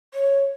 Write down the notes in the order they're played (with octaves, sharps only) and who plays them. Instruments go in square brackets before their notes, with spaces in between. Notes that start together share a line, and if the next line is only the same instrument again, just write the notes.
[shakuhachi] C#5